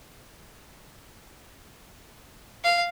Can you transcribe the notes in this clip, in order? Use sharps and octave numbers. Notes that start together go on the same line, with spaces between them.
F5